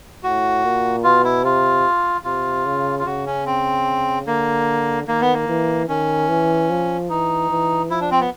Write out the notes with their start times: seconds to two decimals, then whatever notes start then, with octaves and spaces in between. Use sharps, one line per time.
0.23 A2 F#4
0.64 A#2
1.04 B2 F4
1.24 E4
1.44 C3 F4
2.24 C3 F4
2.66 C#3
2.99 F4
3.05 C#3 F#4
3.26 C#4
3.46 C4
4.26 D3 A#3
5.07 D#3 A#3
5.21 B3
5.34 A#3
5.48 E3
5.89 D#3 C#4
6.28 E3
6.70 F3
7.10 E3 D#4
7.50 E3
7.90 F3 E4
8.01 D4
8.11 C4
8.21 B3